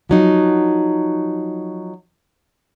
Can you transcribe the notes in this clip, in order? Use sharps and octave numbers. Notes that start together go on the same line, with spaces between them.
F3 F#3 D#4